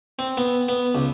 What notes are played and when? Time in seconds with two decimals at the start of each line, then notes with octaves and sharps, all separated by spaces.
0.19 C4
0.37 B3
0.69 B3
0.95 C#2